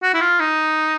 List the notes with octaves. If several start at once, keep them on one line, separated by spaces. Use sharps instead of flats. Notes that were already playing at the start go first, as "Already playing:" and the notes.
F#4
E4
F4
D#4